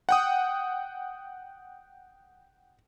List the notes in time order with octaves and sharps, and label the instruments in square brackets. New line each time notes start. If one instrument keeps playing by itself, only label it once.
[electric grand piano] F#5 G5 D#6